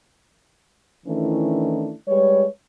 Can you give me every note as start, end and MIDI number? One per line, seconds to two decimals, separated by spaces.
1.07 1.93 51
1.07 1.93 52
1.07 1.93 57
1.07 1.93 61
1.07 1.93 62
1.07 1.93 64
2.08 2.46 55
2.08 2.46 56
2.08 2.46 71
2.08 2.46 73